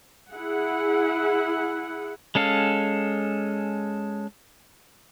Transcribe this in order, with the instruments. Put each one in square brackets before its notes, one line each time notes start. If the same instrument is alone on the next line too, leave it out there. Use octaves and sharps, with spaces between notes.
[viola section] E4 G#4 F#5
[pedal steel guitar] G#3 C#4 A4 F5